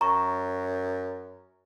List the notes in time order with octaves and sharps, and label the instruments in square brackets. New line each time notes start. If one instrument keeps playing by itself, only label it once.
[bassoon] F#2 [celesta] A#5 C#6